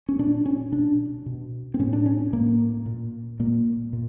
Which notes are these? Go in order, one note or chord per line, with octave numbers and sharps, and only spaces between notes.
C#4
A#2 D4
C#4
B2 D4
B2
C4
A2 C#4
D4
C#4
A2 A#3
A#2
A#2 A#3
A#2